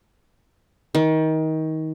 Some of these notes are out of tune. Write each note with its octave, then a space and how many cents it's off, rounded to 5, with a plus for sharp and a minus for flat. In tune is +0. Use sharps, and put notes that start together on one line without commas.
D#3 +25